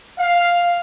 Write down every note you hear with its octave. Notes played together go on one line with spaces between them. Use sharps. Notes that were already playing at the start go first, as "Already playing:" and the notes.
F5